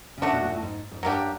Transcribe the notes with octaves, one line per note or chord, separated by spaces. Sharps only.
C#3
D3 A3 D4 F#4
B2
A#2
A2
G#2
G#2
G2 F#3 A#3 D4 G4